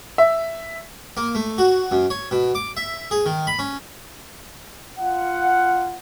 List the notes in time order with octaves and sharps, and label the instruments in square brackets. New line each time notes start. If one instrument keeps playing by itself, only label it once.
[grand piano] E5
[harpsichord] A#3
A3
F#4
F#2
C#5
B2
D6
E5
G#4
D#3
B5
C#4
[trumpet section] F4 F5 F#5